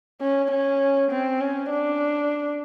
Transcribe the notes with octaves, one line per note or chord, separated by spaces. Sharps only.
C#4
C#4
C4
C#4
D4